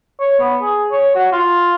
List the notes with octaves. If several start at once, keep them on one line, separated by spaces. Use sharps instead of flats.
C#5
B3
G#4
C#5
F#4
F4